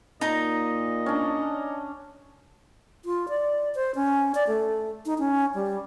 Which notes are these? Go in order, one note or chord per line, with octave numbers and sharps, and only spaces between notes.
A#2 D#4 D#5 A#5
C#4 D4
F4
D5
C5
C#4
D5
A3
D#4
C#4
G3